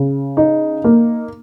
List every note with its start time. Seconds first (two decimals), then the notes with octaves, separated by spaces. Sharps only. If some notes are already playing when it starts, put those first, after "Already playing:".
Already playing: C#3
0.37 D#4
0.84 A#3